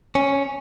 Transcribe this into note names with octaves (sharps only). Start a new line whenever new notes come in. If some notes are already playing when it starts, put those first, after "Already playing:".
C#4